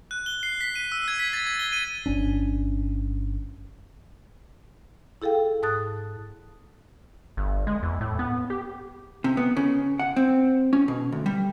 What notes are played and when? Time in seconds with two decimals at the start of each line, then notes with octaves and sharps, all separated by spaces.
0.11 F#6
0.26 G7
0.43 C7
0.61 B6
0.76 D#7
0.92 E6
1.08 G#6
1.19 B6
1.33 A6
1.47 G#6
1.59 G7
1.72 D#7
2.06 G1 C#4 D4
5.22 E4 G#4 A4 F5 G5
5.62 G#2 A5 D#6 F#6 A6
7.37 G1
7.67 G#3
7.83 E2
8.01 A2
8.19 B3
8.50 G4
9.24 C3
9.37 B3
9.57 C#3
9.99 F#5
10.16 C4
10.73 C#4
10.88 B2
11.12 D2
11.26 G3